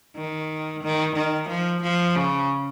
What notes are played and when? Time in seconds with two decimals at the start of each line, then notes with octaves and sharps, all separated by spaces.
0.17 D#3
0.83 D#3
1.15 D#3
1.49 F3
1.82 F3
2.15 C#3